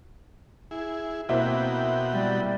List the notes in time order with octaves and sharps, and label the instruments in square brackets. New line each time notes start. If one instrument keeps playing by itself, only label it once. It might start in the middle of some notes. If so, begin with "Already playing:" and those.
[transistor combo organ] E4 G#4
[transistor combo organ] B2 F#4 G5 [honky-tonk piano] A#3 C4 E4
[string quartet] G3